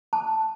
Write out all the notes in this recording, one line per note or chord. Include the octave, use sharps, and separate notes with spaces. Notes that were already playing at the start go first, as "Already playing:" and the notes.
A5